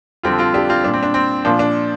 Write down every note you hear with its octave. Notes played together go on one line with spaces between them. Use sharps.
F2 D3 G3 C4 F4
C4 F4
D4 G4
C4 F4
A#2 G3 D4
C4
D4
C4
A#2 F3 D4
D4